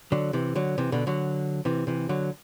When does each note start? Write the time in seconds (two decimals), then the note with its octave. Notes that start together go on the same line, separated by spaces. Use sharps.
0.12 D3 F#3
0.33 C3 E3
0.55 D3 F#3
0.78 C3 E3
0.92 B2 D3
1.07 D3 F#3
1.65 C3 E3
1.87 C3 E3
2.09 D3 F#3